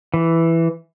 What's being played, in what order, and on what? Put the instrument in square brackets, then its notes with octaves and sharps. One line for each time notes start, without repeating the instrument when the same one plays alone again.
[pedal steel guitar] E3